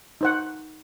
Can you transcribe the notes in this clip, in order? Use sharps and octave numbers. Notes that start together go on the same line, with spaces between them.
D#4 C5 F#5